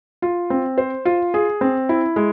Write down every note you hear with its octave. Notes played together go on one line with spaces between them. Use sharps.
F4
C4
C5
F4
G#4
C4
E4
G#3